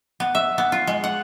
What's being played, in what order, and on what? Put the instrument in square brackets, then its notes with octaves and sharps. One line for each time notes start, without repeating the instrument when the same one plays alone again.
[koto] B3
E5
B3
F4
G#3
F#5